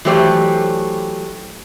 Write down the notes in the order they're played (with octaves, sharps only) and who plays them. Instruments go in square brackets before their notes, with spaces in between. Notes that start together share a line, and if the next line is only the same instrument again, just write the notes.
[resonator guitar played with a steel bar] E3 F#3 A3 G4 C5 D5